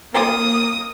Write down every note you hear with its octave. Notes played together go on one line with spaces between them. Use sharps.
A#3 D#6